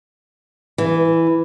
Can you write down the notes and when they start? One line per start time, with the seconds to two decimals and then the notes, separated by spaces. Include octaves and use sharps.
0.78 E3